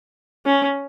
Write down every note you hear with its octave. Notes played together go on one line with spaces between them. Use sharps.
C#4